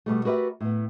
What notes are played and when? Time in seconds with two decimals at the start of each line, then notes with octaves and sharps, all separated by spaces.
0.06 B2 G3 A3
0.25 F#4 G4 A#4 B4 D5 E5
0.60 A2 B3